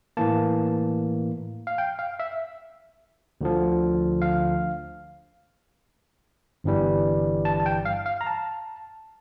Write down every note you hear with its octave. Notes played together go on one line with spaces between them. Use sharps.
A2 E3 A#3 A5
F5
G5
F5
E5
D2 D3 F3
F5
G1 G2 E3 G3
A5
A5
G5
F5
F5
A#5
A5